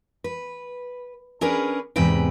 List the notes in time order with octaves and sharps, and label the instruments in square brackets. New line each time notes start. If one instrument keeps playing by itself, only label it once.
[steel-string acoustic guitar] B4
C#4 D4 G#4 A#4 B4
E2 G#2 C3 B4 G5